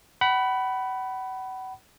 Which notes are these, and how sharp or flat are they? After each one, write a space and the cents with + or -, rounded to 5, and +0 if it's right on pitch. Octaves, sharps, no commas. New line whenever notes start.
F#5 +35 B5 +0